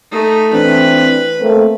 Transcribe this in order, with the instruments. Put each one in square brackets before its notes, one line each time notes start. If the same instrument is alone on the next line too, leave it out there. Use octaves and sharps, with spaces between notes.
[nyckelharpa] A3 D#4
[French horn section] E3 C4 D4 [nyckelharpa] B4
[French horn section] A3 A#3 C4